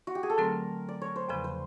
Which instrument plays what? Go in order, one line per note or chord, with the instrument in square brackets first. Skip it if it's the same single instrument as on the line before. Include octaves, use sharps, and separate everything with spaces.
[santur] F#4
G4
G#4
A4
[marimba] D3 F#3 A3 C4 [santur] A#4
[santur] D5
C#5
C5
[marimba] E2 C#3 F3 [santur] B4
[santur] C5